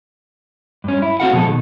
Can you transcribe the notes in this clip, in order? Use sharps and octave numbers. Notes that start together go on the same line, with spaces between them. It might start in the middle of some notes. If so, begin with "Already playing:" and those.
G2 C#4
E4
C4 C#4 F#4 A4 F5 F#5
B2 F3 G#4 A4
B2 D#3